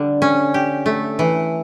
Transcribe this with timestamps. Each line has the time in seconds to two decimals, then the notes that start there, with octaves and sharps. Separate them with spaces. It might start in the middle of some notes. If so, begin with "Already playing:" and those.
Already playing: D3 G3
0.22 C#4
0.54 G4
0.86 A3
1.19 E3